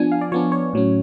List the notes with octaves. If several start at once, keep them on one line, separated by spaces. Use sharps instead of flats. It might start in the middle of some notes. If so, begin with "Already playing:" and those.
Already playing: F3 B3 D4 G#5
F5
D5
F3 B3 D4 C#5
C#5
A2 F#3 C#4